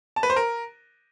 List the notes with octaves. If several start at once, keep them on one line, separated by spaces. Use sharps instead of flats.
A5
B4
C5
A#4